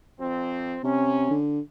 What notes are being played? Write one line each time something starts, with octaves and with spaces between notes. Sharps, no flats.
F2 C4
C3 C#4
D3